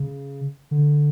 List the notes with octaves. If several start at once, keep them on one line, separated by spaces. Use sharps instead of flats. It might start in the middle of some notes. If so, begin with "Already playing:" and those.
Already playing: C#3
D3